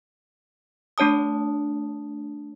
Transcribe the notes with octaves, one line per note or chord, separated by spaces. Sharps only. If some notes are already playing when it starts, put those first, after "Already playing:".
A3 D4 C#5 A5 D#6